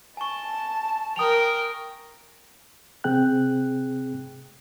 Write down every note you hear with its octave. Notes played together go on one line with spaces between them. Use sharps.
G#5 A5 C#6
A#4 G5 D#6 F7
C3 C4 G#4 G5 F#6